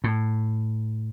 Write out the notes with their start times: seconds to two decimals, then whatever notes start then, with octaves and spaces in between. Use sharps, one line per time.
0.04 A2